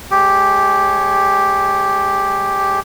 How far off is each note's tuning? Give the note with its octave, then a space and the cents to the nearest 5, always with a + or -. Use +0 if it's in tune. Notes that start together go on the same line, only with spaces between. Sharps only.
G#3 +25 G4 +0 C#5 +0